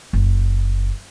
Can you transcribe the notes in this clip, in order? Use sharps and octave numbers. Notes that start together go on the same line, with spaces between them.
F#1